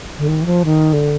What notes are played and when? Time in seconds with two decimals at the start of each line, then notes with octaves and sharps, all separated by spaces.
0.18 D3
0.28 D#3
0.42 E3
0.46 F3
0.65 D#3
0.93 D3